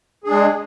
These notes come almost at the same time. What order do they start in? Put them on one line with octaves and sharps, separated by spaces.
G#4 D4 G#3